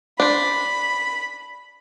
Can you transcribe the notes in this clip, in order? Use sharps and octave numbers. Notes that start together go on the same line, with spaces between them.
D4 C5 B5